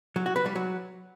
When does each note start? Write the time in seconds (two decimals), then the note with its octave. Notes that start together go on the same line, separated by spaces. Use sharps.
0.16 F#3
0.26 F#4
0.36 B4
0.46 G3
0.55 F#3